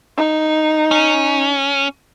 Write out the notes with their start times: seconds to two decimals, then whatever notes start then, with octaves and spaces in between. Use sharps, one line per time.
0.17 D#4
0.91 C#4